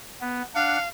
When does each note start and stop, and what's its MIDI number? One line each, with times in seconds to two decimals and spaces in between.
0.21 0.42 59
0.55 0.78 62
0.55 0.88 77
0.55 0.78 78